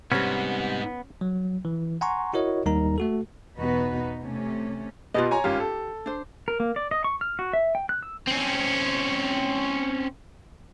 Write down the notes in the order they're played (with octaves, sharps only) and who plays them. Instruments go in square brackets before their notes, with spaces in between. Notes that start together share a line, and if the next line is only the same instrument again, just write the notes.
[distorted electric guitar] G#2 [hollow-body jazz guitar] C3 G3 [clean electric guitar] B3 [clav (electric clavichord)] C#4
[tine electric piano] F#3
E3
F#5 G#5 A#5 C6 C#6
E4 F#4 A#4 C#5 D#5
D#2 G3 D#4 A#4 A#5
A3 F#4 A4
[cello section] E2 B2 B3 D#4 F#4 B4
C3 A3 C#4
[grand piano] B2 B3 [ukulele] F4 G4 D#5
[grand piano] C#5 G#5 A#5
[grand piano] G#1 C#4 F4 [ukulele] G4
[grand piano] A4
[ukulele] D4 C5
[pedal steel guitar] A#4
A#3
D5
D#5
C#6
F6
F#4
E5
G5
F#6
E6
[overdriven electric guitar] C4 C#4